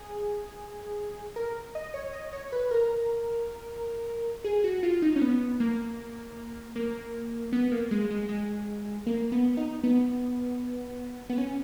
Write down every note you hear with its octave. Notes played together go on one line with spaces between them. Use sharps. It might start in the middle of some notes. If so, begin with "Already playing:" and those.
Already playing: G#4
A#4
D#5
C#5
D#5
C#5
B4
A#4
G#4
F#4
F4
D#4
C#4
B3
A#3
A#3
B3
A#3
G#3
G#3
G#3
A#3
B3
D#4
B3
B3
C#4